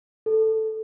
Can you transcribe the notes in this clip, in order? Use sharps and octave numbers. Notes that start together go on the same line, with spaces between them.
A4